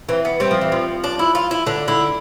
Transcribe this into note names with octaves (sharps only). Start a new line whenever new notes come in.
E3 C4
B3
G3 C4
F3
E3
F3
D4
E4
F4
E4
D3 D4
D3 E4